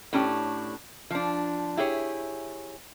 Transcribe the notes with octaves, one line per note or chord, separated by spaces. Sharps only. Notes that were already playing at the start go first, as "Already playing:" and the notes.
A2 C#4 D4 G4
F3 D4
E4 G4 G#4 C#5